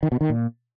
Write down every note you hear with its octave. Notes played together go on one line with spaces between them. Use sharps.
D#3
B2
D#3
A#2